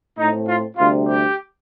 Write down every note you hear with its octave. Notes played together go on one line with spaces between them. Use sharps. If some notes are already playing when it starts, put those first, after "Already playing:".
A2 A3 C4 D#4
F4
D2 C3 G3 F4
G4